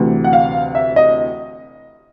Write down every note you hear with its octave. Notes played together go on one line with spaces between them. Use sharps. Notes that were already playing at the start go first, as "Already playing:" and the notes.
Already playing: D2 C3 E3
F#5
F5
E5
D#5